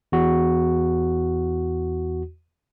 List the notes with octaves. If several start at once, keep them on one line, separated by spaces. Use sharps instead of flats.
E2 F#4